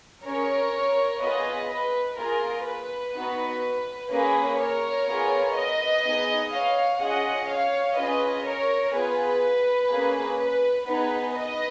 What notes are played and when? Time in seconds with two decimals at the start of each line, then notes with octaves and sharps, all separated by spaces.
0.24 C#4 G#4 A#4 C#5
1.21 B3 F4 G#4 B4 D#5
1.69 B4
2.17 A#3 F4 G#4 A#4
2.66 B4
3.14 B3 D#4 F#4
4.10 A#3 C#4 G#4 B4
4.58 A#4 C#5
5.07 B3 F4 G#4
5.55 B4 D#5
6.03 B3 D#4 G#4
6.51 C#5 F5
7.00 C#4 F4 G#4 D#5 F#5
7.48 C#5 F5
7.96 C#4 F4 G#4 B4 D#5
8.44 A#4 C#5
8.93 B3 F4 G#4 B4
9.90 A#3 C#4 G#4
10.38 B4
10.86 B3 D#4 G#4 B4
11.34 B4 D#5